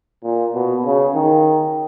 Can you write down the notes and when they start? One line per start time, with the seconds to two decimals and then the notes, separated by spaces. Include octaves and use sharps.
0.24 A#2
0.54 B2
0.85 C#3
1.15 D#3